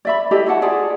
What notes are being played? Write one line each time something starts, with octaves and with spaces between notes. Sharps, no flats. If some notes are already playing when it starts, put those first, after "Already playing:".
D5 E5 B5
E4 G4 A4 D#5
E4 F#4 F#5 A5
F4 G#4 D5 A5